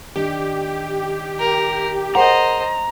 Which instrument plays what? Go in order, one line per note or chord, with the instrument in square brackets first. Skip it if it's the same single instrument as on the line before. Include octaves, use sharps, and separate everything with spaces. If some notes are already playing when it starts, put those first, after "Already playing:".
[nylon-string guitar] D#3 D4 [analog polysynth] G4
[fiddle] A#4
[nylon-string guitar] G#4 A#4 F#5 [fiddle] C5 D#5 [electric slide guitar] A#5